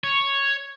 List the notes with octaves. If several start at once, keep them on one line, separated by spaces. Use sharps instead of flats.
C#5